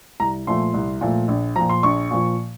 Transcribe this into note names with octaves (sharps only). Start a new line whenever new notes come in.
C2 A#5
A#2 F3 A3 C6
C2
A#2 F3 A3
A#1
A#2 F3 A#5
C6
A#1 C#6
A#2 F3